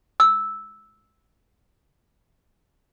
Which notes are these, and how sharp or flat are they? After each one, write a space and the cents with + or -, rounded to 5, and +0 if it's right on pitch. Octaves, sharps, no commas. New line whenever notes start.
E6 -10